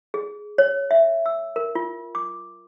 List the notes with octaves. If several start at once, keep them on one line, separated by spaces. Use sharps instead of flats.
G#4
C#5
E5
E6
A#4
F4
D6